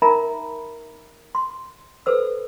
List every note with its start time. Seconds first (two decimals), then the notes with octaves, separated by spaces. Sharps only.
0.02 D#4 A#4 E5 G#5 A#5 B5
1.35 C6
2.06 A4 B4 C5 E6